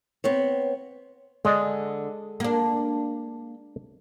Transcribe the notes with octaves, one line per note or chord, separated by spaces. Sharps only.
B3 C4 C#5
D3 G#3 D5 D#5
A#3 D4